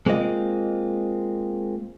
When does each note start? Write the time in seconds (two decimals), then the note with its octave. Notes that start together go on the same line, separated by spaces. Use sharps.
0.06 G#3 A#3 C4 F4 D#5